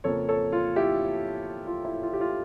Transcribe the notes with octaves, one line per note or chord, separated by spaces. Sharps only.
F2 C#3 F3 A#3 A4 C#5
A4 C#5
F4
E4 G4
F4
E4
F4
G4
F4